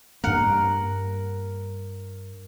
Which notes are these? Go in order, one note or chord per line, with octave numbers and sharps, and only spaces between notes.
G2 A#3 A#4 F#5